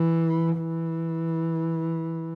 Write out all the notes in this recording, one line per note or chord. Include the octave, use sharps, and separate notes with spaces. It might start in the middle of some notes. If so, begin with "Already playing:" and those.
Already playing: E3
E3